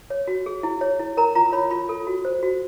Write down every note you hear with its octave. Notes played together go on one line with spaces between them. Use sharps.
C#5
F#4
G#4
E4
C#5
E4
A#4 A#5
F4 A#5
C#5 B5
F4 B5
A4
F#4
C5
F#4